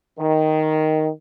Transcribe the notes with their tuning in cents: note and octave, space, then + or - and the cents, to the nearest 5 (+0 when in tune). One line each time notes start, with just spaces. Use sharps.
D#3 +0